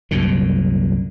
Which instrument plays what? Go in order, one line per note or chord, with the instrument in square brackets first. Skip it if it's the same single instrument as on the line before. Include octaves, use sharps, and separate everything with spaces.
[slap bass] C2 F#2 A#2 D3